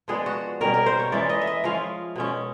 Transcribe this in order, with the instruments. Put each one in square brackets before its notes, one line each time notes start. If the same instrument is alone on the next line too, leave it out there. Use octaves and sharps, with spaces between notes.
[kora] F3 G#3 B3 D4 G#4
F#4
B2 G3 A#3 C#4 A#4
A#4
C5
C#5
E3 G#3 C#4 E4 D5
D#5
E5
D#5
F3 G#3 C#4 E4 F5
B2 G#3 C#4